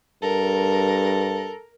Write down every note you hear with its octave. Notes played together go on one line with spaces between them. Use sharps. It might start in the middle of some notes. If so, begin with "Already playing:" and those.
G2 A4 A#4